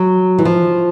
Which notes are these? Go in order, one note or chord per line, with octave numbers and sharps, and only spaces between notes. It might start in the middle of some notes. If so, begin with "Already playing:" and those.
Already playing: F#3
E3
F3